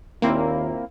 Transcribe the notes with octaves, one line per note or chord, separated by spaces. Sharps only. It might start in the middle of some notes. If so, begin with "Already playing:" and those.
D#2 A#2 A#3 C4 E4